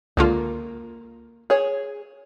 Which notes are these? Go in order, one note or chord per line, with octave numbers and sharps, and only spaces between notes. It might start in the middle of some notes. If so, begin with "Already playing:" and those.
C#2 D3 A#3 F4
G#4 C#5